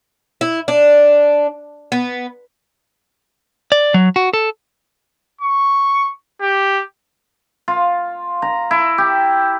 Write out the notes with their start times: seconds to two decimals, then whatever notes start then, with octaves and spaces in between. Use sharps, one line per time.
0.41 E4
0.68 D4
1.92 B3
3.72 D5
3.94 F#3
4.16 F#4
4.34 A4
5.41 C#6
6.41 G4
7.68 F4
8.42 A#5
8.71 E4
8.98 G4